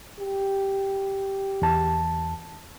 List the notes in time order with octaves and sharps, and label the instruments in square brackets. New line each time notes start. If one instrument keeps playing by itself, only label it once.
[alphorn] G4
[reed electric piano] E2 A5